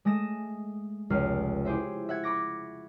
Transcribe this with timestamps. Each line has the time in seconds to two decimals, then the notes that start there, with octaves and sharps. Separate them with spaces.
0.05 G#3 A3 D#6 A#6 E7
1.10 F1 C#2 F6 C7
1.65 E4 G4 G#4 C5 E5
2.09 E5 F#5 G#6
2.24 B5 C#6 D6 A#6